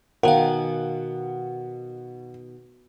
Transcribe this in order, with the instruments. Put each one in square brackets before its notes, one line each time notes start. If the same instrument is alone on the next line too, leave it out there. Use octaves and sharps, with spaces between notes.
[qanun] B2 D#3 G#5 [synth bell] A#4 F5 [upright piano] F#5